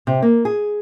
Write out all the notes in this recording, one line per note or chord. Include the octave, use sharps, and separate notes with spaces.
C3
A#3
G#4